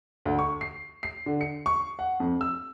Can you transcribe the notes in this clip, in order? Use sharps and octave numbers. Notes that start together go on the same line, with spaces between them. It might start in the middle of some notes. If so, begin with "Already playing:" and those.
D2
C#6
C7
C7
D3
C#7
C#6
F#5
F2
E6